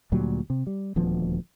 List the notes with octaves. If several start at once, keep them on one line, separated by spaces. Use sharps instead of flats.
D2 A#2 F#3 G3
C3
G3
D#1 D2 F3 B3